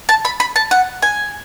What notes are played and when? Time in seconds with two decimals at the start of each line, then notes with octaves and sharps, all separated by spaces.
0.09 A5
0.25 B5
0.40 B5
0.56 A5
0.71 F#5
1.02 G#5